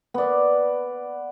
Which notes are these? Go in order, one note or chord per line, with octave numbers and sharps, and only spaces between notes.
B3 D5